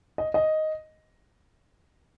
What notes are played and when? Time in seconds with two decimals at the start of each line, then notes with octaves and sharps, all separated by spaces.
0.18 D#5
0.34 D#5